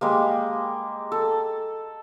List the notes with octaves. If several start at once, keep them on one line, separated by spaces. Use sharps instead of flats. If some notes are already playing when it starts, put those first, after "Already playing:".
G3 G#3 A#3
A4